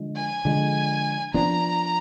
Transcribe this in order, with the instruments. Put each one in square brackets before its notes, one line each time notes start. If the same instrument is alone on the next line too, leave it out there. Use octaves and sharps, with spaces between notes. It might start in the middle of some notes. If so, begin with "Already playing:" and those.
Already playing: [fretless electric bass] D3 F3 G#3
[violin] G#5
[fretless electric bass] D3 F3 G#3
[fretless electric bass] F3 B3 D4 [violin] A#5